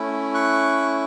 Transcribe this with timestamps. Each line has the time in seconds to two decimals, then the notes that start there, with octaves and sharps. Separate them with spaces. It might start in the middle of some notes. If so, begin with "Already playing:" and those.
Already playing: A3 C#4 E4
0.34 C#6 F#6